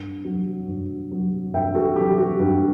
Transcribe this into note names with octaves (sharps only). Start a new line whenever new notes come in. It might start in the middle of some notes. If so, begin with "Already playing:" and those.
Already playing: G2
F#3
G2
F#3
G2 E5 G5
F#4 A4
F#3 G4
F#4
G2 F#4